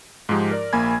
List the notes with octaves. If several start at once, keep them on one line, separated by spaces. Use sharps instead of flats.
G#2 F3 G#3 D#4 G4
A#4 D5
A#1 A#3 G#5 B5 G#6